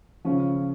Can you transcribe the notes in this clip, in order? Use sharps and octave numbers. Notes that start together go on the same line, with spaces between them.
C#3 F3 C#4